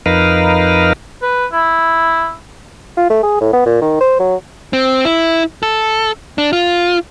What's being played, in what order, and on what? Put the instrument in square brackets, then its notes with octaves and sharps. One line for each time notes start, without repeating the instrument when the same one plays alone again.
[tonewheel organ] F2 D#4 A#4 B4 F5
[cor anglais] B4
E4
[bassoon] F4
A3
G#4
A2
B3
A#2
D#3
C5
F#3
[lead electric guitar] C4
E4
A4
D4
F4